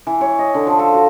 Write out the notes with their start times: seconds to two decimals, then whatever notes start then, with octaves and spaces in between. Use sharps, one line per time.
0.07 E3
0.21 C#5
0.39 D#5
0.54 D3
0.67 F3
0.79 A4
0.94 F#4